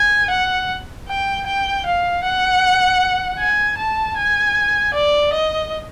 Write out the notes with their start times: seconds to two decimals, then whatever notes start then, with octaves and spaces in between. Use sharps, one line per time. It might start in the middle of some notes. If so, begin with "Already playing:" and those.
Already playing: G#5
0.30 F#5
1.08 G5
1.46 G5
1.86 F5
2.23 F#5
3.39 G#5
3.78 A5
4.17 G#5
4.94 D5
5.33 D#5